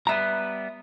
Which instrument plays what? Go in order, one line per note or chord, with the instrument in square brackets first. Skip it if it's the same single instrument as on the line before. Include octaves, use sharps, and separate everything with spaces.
[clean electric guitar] G3 B3 B4 [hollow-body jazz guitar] E5 A#5